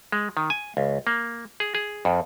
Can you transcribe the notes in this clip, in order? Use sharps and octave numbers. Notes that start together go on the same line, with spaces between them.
G#3
D#3
G#5
C#2
A#3
G#4
G#4
F2